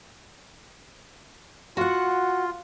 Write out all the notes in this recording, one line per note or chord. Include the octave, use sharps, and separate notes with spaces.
F4 F#4 F#5